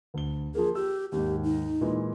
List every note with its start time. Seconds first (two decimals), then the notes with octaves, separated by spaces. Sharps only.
0.14 D2 G7
0.55 F3 A#3 G#4
0.75 G4 E6
1.12 D#2 G#2 G4
1.44 D#4
1.81 A#2 E3 G#3